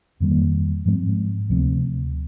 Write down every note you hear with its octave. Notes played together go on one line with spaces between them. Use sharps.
F2 D#3 G3 A#3
G#2 F3 G#3 C4
D2 C3 F3 C4